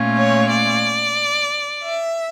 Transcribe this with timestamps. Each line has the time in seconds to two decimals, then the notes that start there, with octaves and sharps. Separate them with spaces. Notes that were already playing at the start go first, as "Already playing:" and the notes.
Already playing: A#2 A3 C#4 F4
0.16 C#5
0.49 D5
1.81 E5